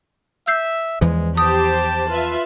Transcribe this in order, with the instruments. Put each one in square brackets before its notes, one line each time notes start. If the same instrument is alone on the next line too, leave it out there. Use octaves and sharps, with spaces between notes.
[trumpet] E5 [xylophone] E6 G6 C7
[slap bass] E2 E3 F3 [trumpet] G#3
[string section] G4 C5 [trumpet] A5 [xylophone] D#6
[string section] F4 B4 E5